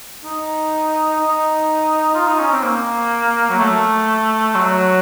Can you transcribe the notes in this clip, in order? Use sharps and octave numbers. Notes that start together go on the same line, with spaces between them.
D#4
D#4
F4
D#4
C#4
C4
A#3
F#3
A3
F#3